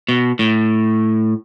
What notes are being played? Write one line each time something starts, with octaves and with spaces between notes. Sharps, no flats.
B2
A2